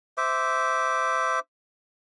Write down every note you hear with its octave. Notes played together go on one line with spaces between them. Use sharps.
C5 E5 D6